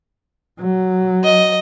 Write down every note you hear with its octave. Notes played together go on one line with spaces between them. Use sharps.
F#3
D#5